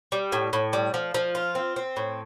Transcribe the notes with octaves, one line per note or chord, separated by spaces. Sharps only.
G3
A2
A2
G3
F3
F3
F4
C4
C4
A2